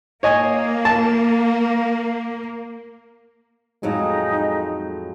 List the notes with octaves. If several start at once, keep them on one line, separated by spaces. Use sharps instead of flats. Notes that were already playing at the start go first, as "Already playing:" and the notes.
A#3 C#5 D#5 G#5
A5
F2 A2 F#3 G#3 D#4